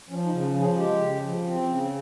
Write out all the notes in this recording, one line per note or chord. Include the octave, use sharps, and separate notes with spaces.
F3 C#4
D#4
C#3
F4
F3
G#4
G#3 G4
C#3
F3
C4
C#3